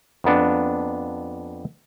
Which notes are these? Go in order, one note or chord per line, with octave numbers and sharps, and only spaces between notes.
F2 A#3 B3 D4